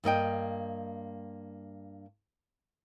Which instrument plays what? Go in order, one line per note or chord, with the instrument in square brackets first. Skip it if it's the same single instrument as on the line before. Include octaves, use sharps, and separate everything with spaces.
[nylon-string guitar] G2 A#3 D#5 G5